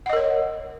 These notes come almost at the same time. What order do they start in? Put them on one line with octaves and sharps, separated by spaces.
F#5 D#5 A#4 C#5